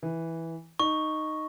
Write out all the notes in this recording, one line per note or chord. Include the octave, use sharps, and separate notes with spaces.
E3
D#4 C#6